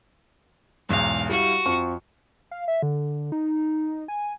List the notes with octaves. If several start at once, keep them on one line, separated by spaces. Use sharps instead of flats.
B1 E2 G#2 F5
G3 E4 F#4 F5
F2 F3 C#6
F5
E5
D3
D#4
G#5